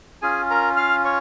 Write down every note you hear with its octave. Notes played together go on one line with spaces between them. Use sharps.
C#4 F4 G#4 G#5
A#4 A#5
F5 F6
C#5 C#6